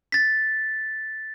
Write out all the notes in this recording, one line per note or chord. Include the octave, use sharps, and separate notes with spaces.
A6 B6